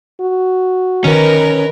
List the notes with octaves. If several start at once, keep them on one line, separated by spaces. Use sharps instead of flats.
F#4
D#3 C#4 A#4 B4